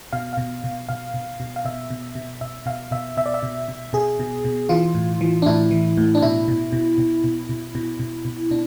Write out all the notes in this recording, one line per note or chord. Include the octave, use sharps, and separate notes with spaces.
B2 F5
B2 F5
B2
B2 F5
B2
B2
F5
B2 E5
B2
B2
B2 E5
B2 F5
B2 E5
B2 E5
D5
E5
B2
B2
B2 G#4
B2
B2
E3 F4
A2
E3
D4
A2 E4
E3
A2
D4
B2 E4
B2
B2
B2
B2
B2
B2
B2
B2
B2 D4